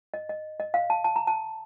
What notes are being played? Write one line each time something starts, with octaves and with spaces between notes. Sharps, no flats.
D#5
D#5
D#5
F5
A5
A5
A#5
A5